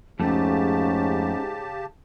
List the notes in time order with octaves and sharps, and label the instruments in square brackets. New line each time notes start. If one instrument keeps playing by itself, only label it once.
[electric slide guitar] F2 A3 [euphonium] G#2 [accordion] C#3 G4 A5 [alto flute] C#4